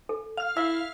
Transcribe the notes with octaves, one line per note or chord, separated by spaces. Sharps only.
A4
F5 F6
E4 E5 E6